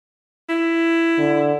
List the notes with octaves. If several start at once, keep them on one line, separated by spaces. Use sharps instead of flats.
E4
D3